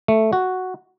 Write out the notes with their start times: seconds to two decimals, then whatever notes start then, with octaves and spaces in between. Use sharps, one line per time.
0.08 A3
0.33 F#4